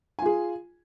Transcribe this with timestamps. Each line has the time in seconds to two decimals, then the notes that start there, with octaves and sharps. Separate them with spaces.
0.19 G#5
0.22 F4
0.26 G#4